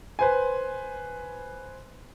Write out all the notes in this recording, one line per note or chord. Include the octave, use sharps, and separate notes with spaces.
B4 C5 G#5